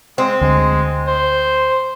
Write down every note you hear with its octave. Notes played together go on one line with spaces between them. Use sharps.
G#3 C4
D2 G#3
C5